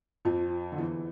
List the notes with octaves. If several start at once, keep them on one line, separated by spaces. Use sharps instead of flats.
F2 F3
D3
E2 E3